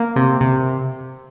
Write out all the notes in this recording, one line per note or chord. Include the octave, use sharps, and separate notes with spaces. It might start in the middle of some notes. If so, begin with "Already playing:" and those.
Already playing: A#3
C3
C3